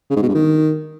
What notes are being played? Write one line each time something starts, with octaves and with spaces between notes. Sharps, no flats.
C#3
G#2
B2
G2
D#3